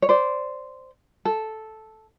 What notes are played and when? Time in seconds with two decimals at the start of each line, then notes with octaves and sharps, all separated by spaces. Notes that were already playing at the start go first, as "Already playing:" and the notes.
0.02 C#5
0.09 C5 D5
1.25 A4